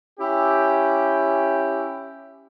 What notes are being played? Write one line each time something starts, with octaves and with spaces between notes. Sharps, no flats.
C#4 E4 G4